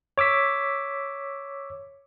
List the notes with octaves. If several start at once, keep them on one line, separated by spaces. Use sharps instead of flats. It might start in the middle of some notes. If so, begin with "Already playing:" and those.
C#5 D6 E6 B6